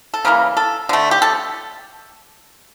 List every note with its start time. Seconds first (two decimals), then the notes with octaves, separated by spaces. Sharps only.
0.14 A4
0.25 C#3 E3 A#3 A#4
0.57 A4
0.89 D3 A3
1.11 G4
1.22 A4